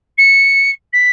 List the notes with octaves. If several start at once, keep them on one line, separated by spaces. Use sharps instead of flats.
C#7
B6